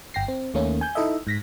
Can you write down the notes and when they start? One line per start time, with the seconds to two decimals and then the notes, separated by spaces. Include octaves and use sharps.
0.14 G1 G5 A#6 C7
0.28 C4
0.54 D#2 D#3 A3 A#3 C#4
0.81 G#5 G6
0.95 D#4 E4 A4 D#5 E5
1.27 G#2 A#6 B6